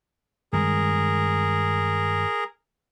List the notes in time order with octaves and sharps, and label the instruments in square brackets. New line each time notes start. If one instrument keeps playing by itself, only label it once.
[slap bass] G2 D#3 G#3 [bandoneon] G#4 A#4